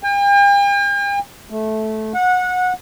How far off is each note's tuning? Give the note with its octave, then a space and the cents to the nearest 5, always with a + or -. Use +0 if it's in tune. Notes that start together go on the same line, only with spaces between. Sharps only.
G5 +45
A3 -15
F#5 -20